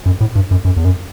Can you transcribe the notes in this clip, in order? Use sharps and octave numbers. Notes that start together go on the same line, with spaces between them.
F#2
A2
G2
F#2
F#2
E2
F#2